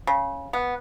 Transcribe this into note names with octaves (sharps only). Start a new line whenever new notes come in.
C#3
B3